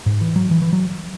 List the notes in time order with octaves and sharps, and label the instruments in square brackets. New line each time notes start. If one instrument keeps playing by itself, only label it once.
[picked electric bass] G#2
E3
F#3
E3
E3
F#3